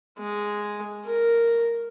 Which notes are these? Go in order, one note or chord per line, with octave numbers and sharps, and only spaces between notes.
G#3
A#4